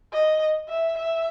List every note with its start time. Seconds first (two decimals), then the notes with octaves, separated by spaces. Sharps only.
0.13 D#5
0.69 E5
0.98 E5